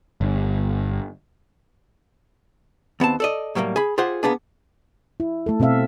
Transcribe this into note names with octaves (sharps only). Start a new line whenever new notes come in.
G1
D#2 B3 C4 A5
A4 D5 D#5
A2 F#3 G3 A3 A#3
G#4 B5
F4 G4 G#4 C5 F#5
A#3 B3 D4 G#4
E4
A3 A4
B2 C4 A4 E5 F5